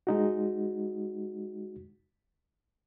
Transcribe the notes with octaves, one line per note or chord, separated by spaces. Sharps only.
G#3 D#4 F#4